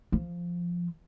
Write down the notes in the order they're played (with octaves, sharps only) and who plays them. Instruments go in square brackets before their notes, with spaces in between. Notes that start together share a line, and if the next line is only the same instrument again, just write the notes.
[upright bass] F3